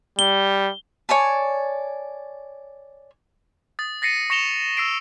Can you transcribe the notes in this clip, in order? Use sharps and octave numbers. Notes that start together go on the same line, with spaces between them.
G3 G7
C#5 D5 G#5 A5
D#6 A6
A6 A#6 C7 C#7 D#7
C#6 A#6 C#7 E7 F7 G7
E6 C7 D7